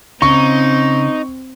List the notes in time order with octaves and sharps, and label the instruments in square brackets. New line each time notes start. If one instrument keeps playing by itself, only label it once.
[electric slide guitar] C#3 [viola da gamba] C4 [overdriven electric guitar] D#4 [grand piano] C#6